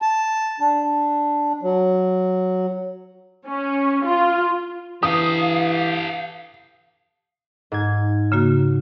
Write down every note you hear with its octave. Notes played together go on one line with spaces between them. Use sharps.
A5
D4
F#3
C#4
F4
E3 G4 A4 F5 D#6
G#2 G#6
C#3 A#3 F#4